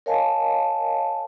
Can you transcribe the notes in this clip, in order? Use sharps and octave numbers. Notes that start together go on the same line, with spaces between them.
A#4 C#5 D#5 F5 G#5 A5